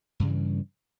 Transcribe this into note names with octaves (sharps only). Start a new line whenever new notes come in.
G2 C#3 E3 G3